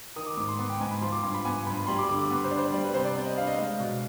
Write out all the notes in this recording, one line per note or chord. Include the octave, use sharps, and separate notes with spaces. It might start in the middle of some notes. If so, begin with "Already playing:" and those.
D#3 D#6
D6
G#2 D6
C6
B3
G5
G#2 G#5
B5
F3 C6
D6
G2 C6
B5
B3 G#5
G2 B5
G3 C6
D6
D3 D6
D6
B3
C5
D4
C5
G3 D5
B4
C3 C5
D5
B3 D5
D#5
D4 F5
D#5
G#3 F5
B2